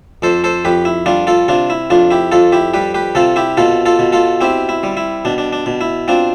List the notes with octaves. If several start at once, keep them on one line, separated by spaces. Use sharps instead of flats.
F2 A4 C5
A4 C5
F2 G4 B4
E4
G3 D4 F4
F4 A4
C3 D4 F4
E4
F2 D4 F4
E4 G4
F2 F4 A4
E4 G4
G3 G4 B4
G4 B4
C3 F4 A4
E4 G4
B2 F4 A4
F4 A4
B2
F4 A4
C4 E4 G4
E4
G3
E4
B2 D4
D4
D4
B2
E4
C4 D4 F4